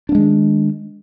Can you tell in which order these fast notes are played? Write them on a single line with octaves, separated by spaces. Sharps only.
D4 A#3 G#3 D#3